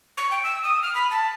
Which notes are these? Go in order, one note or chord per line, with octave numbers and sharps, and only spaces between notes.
C#6
G5
E6
D#6
F6
B5
A5